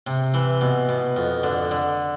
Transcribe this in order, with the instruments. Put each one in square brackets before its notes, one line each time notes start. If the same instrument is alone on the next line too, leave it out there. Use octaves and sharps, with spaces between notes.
[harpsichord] C3
E3
B2
B2
F2
D3
D3